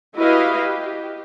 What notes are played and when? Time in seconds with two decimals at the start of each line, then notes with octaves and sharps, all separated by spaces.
0.17 E4 F#4 G4 B4 D#5 F5
0.58 G4